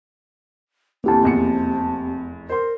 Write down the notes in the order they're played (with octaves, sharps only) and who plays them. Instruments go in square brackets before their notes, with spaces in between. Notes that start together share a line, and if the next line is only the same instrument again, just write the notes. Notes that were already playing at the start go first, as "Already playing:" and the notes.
[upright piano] D2 A2 E3 [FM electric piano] A#3 G4 A5 [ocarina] C4
[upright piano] F1 E2 C#7
[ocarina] A#4 [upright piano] C5 C6